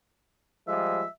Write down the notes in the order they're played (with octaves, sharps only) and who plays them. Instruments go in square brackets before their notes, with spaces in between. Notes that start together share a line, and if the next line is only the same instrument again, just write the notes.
[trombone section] F3 G3 G#3 [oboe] E5